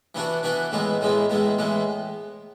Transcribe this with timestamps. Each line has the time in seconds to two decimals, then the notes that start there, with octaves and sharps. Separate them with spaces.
0.15 E3 B3 D4 F#4
0.43 E3 B3 D4 F#4
0.72 A2 E3 G#3 B3
1.01 A2 E3 G#3 B3
1.30 A2 E3 G#3 B3
1.59 A2 E3 G#3 B3